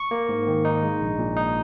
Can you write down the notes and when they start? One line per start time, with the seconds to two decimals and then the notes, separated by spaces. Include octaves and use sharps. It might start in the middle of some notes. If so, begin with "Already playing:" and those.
Already playing: C#6
0.11 A#3
0.29 G#2
0.47 D#3
0.65 D#4
0.83 G#3
1.01 A#1
1.19 A#2
1.37 D#4